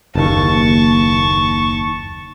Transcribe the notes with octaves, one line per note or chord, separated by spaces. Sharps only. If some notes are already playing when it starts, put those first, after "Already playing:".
F#1 D#2 A5 C#6